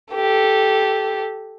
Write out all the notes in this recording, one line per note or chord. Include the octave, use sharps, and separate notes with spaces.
G4 A4